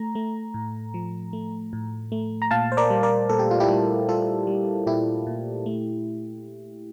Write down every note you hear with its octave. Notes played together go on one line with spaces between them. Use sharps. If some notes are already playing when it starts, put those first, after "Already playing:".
Already playing: A3 A#5
A3
A2
F3
A3
A2
A3
A#5
A#2 F5 A5
C5
A#4 D5
G3
A#4 D5
A#2 A4
G4
F4
E4 G4
G3
G3 F4 A4
G3
A#2 E4 G4
A#2
A3